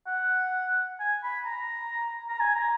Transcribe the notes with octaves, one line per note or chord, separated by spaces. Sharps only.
F#5
G#5
B5
A#5
A#5
G#5
A#5